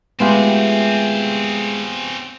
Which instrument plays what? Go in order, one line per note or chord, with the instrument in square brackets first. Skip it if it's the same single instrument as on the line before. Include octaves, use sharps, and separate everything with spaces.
[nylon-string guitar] G#3 A3 [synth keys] B3 F4 G4 [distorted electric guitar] C4 G#4